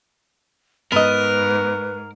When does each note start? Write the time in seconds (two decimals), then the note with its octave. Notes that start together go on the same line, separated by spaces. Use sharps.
0.92 G#2 B3 A#4 B4 D#5